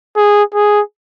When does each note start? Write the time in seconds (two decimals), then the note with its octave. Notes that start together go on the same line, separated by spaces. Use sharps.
0.16 G#4
0.54 G#4